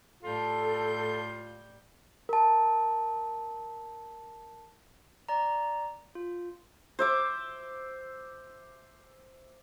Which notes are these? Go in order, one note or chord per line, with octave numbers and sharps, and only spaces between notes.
A2 G3 F4 A4 G6
A#4 A5
D5 A#5
F4
C5 E5 D6